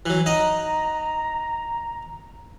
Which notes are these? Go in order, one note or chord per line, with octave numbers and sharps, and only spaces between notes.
E3 F#3 F#6
D#4 D#5 F#5 A#5